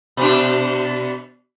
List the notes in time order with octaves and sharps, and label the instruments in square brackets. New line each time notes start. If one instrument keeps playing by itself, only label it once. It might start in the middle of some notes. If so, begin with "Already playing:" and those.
[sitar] B2 D4